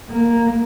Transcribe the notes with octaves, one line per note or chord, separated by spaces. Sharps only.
A#3